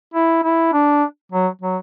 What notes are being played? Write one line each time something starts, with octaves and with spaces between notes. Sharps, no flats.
E4
E4
D4
F#3
F#3